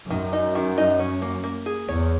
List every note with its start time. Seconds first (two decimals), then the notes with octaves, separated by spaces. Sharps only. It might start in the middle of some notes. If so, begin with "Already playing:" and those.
0.10 F#2 D#3
0.33 D#4
0.55 D#3
0.78 D#4
0.99 C#4
1.22 A#3
1.44 A#3
1.66 G#4
1.88 E2 C#5